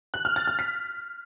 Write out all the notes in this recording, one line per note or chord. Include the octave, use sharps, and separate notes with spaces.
F#6
F6
A6
F6
B6